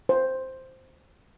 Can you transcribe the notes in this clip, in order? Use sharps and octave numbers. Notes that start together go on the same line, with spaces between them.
C5